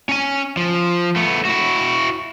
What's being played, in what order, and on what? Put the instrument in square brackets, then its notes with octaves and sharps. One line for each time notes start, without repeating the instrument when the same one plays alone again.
[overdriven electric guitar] C#4 G#5
F3
A3 B3
E4 F#4